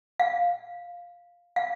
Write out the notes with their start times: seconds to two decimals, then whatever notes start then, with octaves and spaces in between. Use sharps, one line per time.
0.20 F5
1.56 F5